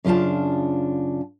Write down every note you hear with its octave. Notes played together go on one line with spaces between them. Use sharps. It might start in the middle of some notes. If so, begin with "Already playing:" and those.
F#2 C#3 D4 F4 A5